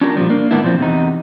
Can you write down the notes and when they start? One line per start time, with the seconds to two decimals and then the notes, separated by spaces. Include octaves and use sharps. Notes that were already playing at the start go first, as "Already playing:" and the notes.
0.01 C#4 D4 F4 G4 A#4
0.16 A#2 C#3 F3 G3
0.29 A#3 D4
0.51 G#2 C3 D#3 B3 D4 E4
0.62 A#2 F3 C4
0.78 E2 C3 D#4